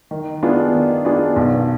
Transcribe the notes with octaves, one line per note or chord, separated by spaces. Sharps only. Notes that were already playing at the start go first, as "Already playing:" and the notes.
D#3
B3 D4 F4 G#4
D#3
B3 D4 F4 G#4
B1